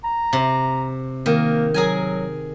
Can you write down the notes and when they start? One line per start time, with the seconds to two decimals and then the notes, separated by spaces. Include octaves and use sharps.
0.04 A#5
0.33 C3
1.26 D#3 A#3
1.74 F#3 G#4 A#4 G#5